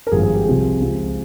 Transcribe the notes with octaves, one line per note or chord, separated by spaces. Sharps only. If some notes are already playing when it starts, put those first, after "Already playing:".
A#4
G#1 G2 F3 G#4
G#4
G4
C2 C3 F3 G#4
C#2 C3 F3